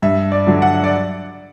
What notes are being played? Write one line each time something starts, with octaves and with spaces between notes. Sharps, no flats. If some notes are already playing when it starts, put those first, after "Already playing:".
G2 E5
D5
D3 F#3
F#5
D5